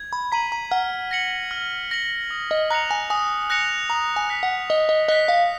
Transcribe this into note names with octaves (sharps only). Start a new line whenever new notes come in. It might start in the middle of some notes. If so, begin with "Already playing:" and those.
Already playing: G#6
B5
A#5 B6 D#7 F#7
A#5
F#5 F6
A#6 C#7 F#7
F6
A#6 C#7 F#7
D#6
D#5
A#5 F#6 A#6 C#7 F7
G#5
G#5 D#6
F#6 A#6 C#7 F7
A#5 D#6
G#5
F#6 B6
F#5
D#5 D#6
D#5
D#5 F#6 B6
F5